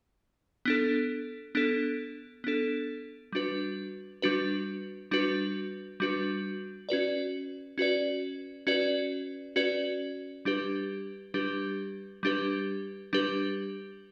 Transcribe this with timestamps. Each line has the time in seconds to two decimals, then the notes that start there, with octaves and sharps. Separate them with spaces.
0.65 B3 D4 A4
1.55 B3 D4 A4
2.44 B3 D4 A4
3.32 G3 D4 F#4 B4
4.22 G3 D4 F#4 B4
5.11 G3 D4 F#4 B4
6.00 G3 D4 F#4 B4
6.89 C#4 F#4 B4 D5
7.78 C#4 F#4 B4 D5
8.67 C#4 F#4 B4 D5
9.56 C#4 F#4 B4 D5
10.45 G3 D4 G4 B4
11.34 G3 D4 G4 B4
12.23 G3 D4 G4 B4
13.13 G3 D4 G4 B4